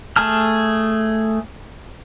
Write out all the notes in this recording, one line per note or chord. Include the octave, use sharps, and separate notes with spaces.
A3 G#4 A5 F6